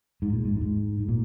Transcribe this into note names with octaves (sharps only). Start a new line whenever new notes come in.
G#2
A#2
G#2
G2
G#2
G#2
A#2